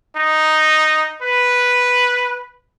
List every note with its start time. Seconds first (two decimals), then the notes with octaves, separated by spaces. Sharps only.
0.16 D#4
1.23 B4